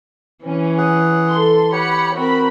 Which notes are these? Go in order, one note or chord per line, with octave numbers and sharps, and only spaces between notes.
E3 C#4
G#4 F#5
A4 C6
G4 C#5 F#5 B5 C#7
C4 F#4 A#4 B5